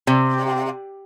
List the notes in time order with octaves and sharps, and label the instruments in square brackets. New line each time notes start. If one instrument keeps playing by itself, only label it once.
[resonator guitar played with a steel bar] C3